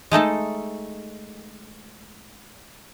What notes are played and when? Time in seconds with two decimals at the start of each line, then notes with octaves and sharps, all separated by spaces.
0.11 G#3 A3 D#4 A4